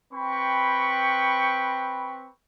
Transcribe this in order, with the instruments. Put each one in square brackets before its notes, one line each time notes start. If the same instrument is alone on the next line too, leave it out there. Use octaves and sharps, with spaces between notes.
[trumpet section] C4 B4 G5 B5 C#6